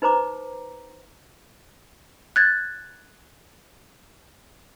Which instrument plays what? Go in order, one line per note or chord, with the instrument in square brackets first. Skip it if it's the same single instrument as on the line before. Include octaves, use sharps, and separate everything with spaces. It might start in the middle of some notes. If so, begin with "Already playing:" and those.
[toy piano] D#4 B4 C5 A#5 D6
[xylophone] F#6 G#6 A6